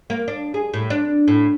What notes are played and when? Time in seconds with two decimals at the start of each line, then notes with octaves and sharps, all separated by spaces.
0.10 A#3
0.28 D4
0.54 G#4
0.74 A2
0.90 D4
1.28 A2